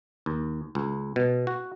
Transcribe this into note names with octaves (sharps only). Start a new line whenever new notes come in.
D#2
C#2
B2
F#4